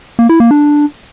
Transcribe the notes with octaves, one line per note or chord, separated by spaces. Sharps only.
A#3
E4
A#3
D4